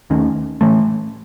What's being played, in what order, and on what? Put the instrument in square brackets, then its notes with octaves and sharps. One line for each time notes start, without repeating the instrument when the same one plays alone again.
[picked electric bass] D#2 D#3 A3 C#4
A2 E3 A3